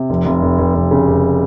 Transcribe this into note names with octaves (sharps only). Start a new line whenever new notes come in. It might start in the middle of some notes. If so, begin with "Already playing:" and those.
Already playing: C3
F1
F1
F1
F1
F1
C#3
F1